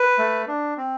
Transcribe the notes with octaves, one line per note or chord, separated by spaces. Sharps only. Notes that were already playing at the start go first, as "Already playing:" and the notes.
Already playing: B4
A3
D4
C4